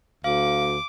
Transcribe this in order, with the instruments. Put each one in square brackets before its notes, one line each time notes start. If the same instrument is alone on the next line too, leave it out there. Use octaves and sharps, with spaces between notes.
[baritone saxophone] D2 [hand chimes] F5 [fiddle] D6